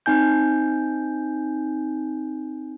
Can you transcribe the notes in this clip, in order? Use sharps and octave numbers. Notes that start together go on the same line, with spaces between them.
C4 D#4 G#5 G6